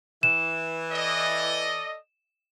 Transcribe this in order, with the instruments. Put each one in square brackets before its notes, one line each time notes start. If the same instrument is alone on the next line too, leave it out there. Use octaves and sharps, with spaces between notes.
[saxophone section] E3 [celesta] E7
[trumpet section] A4 D5 D#5